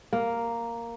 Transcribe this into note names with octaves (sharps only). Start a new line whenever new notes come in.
A#3